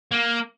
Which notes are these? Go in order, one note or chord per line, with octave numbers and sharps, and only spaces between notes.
A#3